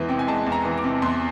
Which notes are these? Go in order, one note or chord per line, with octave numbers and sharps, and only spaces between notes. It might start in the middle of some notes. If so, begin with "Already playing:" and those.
Already playing: E2 E3 G#3
C3 G5
G#5
G#3 A5
E2
A#5
E3
D6
C3
E2 C6